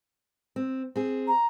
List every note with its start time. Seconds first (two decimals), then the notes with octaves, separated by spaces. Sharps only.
0.56 C4
0.96 C4 G#4
1.28 A#5